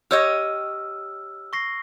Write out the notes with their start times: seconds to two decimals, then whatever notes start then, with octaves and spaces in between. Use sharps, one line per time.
0.11 G4 C#5 D#5 E6 F6
1.53 C#6 A#6 C7